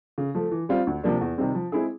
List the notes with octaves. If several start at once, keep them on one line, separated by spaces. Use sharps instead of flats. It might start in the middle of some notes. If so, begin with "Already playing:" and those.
C#3
F3 A3
E3
G3 C4 F4
D2
C3 F3 A#3 D4
E2
C3 D#3 G3 C4
F3
G#3 C4 E4 G#4